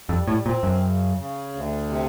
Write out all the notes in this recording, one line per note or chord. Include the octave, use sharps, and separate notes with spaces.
F2 G3
A2
A#2 C4
F#2
C#3
C#3
D2
C3